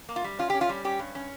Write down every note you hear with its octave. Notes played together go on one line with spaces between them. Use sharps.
A#3
F4
G3
C#4 F4
C#4 G4
F4
G3
C#4 G4
G2
C#4